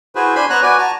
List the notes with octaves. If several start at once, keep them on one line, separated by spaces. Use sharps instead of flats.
E4 F#4 G#4 B4 C5
D4 C5 G#5 B5 C6
B3 C5 C#5 F#5 A#5 F#6
F#4 B4 D5 G#5
F#4 A5 A#5